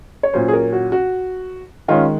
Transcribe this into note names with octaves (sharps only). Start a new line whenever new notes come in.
C#5
A#2 F#3 C#4 C5
G#4
A#4
F#4
F#4
D#3 G#3 C#4 F4